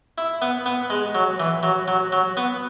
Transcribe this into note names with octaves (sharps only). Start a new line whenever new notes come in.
E4
B3
B3
G#3
F#3
E3
F#3
F#3
F#3
B3